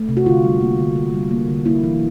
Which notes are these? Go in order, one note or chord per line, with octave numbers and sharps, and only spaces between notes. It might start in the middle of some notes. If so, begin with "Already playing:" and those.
Already playing: A3
C3
F#4
D3 F4
G3
A#3
D3
D3
G3
A#3
D3
A#3 E4
E3